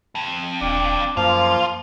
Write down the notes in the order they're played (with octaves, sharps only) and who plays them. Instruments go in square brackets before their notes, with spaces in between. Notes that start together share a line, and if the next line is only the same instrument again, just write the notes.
[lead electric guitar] F2
[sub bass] D#1 [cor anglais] D4
[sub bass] F#2 [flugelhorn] F3 [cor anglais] A#3 [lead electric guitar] F4